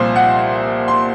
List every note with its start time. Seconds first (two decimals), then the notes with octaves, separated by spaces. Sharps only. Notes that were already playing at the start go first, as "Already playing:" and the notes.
Already playing: C2 A#2 F3 C5
0.16 F#5
0.88 C6